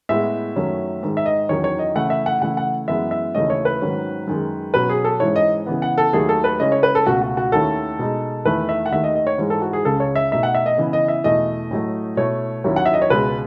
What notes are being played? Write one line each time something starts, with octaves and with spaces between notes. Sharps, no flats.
A2 G#3 B3 E4 E5
F#2 D#3 F#3 A3 C#4
G#2 D#3 G#3
E5
D#5
E2 D#3 F#3 C#4 C#5
C#5
D#5
C#3 E3 A3 E4 F#5
E5
F#5
C#3 E3 A3 E4 F#5
F#5
F#2 E3 G#3 B3 E5
E5
D#2 C#3 E3 A3 C#4 D#5
C#5
B4
G#2 D#3 F#3 C#4
F#2 D#3 G#3
B2 F#3 C#4 B4
G#4
A4
G#2 E3 G#3 C#4 E4 C#5
D#5
C#3 E3 B3
F#5
A4
D#2 D#3 F#3 A3 G#4
A4
B4
C#3 G#3 C#4 E4 D#5
C#5
B4
A4
C#2 B2 A3 F#4
F#4
F#4
D#2 D#3 A3 C#4 E4 A4
B2 G#3 D#4
E2 D#3 A3 E4 B4
E5
F#5
D#2 D#3 A3 E5
D#5
D#5
C#5
G#2 E3 G#3
A4
F#4
G#4
C#2 C#3 G#3 A4
C#5
E5
B2 A3 D#4 E5
F#5
E5
D#5
C#3 E3 B3 E4
D#5
E5
E2 B2 A3 E4 D#5
A2 F#3 A3
B2 A3 E4 C#5
D#2 D#3 F#3 C#4 E4
F#5
E5
D#5
C#5
C#2 B2 G#3 B4